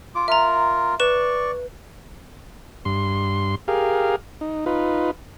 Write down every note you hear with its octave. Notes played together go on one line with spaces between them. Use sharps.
F4 D6
F4 A#4 E5 A#5
B4 D5 C#6 E7
G2 C6
G4 G#4 A#4 F5
D#4
D#4 F4 B4